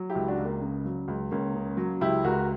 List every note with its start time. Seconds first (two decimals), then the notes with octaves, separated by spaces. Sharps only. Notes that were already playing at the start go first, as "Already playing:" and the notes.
Already playing: F#3
0.10 E4 G4
0.15 C#2
0.28 D4 F#4
0.38 C#2
0.45 A#3
0.62 C#3
0.85 F#3
1.08 C#2
1.31 C#2 A#3 C#4
1.55 C#3
1.77 F#3
2.01 C#2 E4 G4
2.24 C#2 F#4 A#4